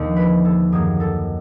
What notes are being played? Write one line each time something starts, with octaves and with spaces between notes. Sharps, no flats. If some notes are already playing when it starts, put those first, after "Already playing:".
Already playing: D#2 D3 F3
B4
A4
F#2 D#3 G3 A#3 G#4
A4